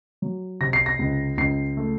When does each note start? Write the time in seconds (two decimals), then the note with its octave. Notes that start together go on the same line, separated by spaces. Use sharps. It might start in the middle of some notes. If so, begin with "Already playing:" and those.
0.22 F#3
0.60 C3 A#6
0.73 C7
0.86 A#6
0.99 C#2
1.38 C#2 C7
1.77 A3